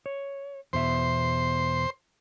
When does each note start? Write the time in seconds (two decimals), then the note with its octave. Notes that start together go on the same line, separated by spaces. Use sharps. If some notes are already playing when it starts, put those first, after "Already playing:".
0.06 C#5
0.73 E2 B2 C5 E5